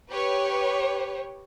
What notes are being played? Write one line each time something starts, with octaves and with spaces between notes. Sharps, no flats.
G4 B4 C#5